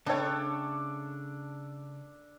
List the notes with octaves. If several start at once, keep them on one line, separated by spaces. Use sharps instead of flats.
C#3 A3 D4 A4 C#5 G5 A5